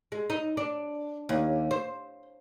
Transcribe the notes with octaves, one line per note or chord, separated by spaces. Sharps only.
G#3
D#4
D4
D#2
C5